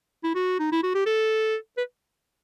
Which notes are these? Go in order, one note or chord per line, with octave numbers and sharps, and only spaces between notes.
E4
F#4
D#4
E4
F#4
G4
A4
B4